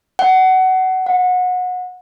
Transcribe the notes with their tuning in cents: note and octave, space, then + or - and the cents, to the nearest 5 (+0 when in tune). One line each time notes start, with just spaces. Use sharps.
F#5 +20
F#5 -25